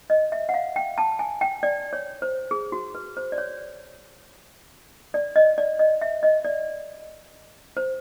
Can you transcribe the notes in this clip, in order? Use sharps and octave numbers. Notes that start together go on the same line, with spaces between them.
D#5
E5
F#5
F5
G5
A5
G#5
G5
D5
C#5
C5
G#4
F#4
B4
C5
D5
C#5
D5
D#5
D5
D#5
E5
D#5
D5
C5